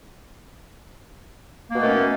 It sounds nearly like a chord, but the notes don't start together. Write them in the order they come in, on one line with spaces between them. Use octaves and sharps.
A#3 B2 A3 D#3 C#4